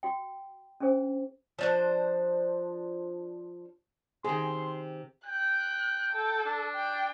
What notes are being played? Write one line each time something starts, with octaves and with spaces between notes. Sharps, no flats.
F#4 G5
C#4 D4 G#4 C5
F3 D4 C5
C3 D#3 G#4 C6
G5 F#6
A4
D4
G5